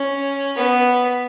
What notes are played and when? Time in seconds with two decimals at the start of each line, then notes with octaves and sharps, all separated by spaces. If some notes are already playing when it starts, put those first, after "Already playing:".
Already playing: C#4
0.56 B3